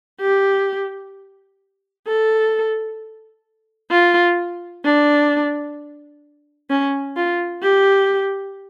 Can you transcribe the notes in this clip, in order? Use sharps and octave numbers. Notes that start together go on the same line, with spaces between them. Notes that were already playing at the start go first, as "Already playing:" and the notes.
G4
A4
F4
D4
C#4
F4
G4